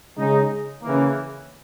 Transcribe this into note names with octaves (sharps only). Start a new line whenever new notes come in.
C#3 G#3 D#4
C#3 E3 A#3